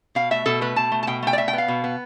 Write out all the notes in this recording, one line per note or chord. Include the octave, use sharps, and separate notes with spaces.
B2 F5
A3 E5
B2 A4
A3 B4
B2 A5
A3
A5
B2 G5
A3 G5
D5
B2 E5
G5
B3 F5
B2
B3